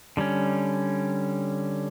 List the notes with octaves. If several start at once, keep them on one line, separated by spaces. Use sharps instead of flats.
D3 G3 C#4